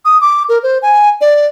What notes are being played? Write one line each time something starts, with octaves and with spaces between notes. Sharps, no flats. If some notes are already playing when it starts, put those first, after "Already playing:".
D#6
D6
A#4
C5
G#5
D5